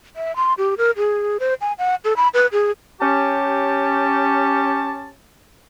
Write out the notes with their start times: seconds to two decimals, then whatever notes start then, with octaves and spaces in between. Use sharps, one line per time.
0.16 E5
0.36 C6
0.58 G4
0.78 A#4
0.97 G#4
1.40 C5
1.61 G#5
1.78 F#5
2.05 A4
2.17 B5
2.34 B4
2.52 G#4
3.01 C#4 G4 A5